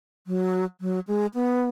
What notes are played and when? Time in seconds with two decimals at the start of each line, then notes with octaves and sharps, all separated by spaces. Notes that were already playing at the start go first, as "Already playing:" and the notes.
0.27 F#3
0.81 F#3
1.07 G#3
1.34 B3